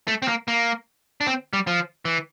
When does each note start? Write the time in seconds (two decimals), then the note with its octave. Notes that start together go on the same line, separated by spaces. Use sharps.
0.08 A3
0.22 C4
0.28 A#3
0.48 A#3
1.21 D4
1.27 C4
1.53 G3
1.67 F3
2.05 E3